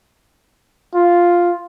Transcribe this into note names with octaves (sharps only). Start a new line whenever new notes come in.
F4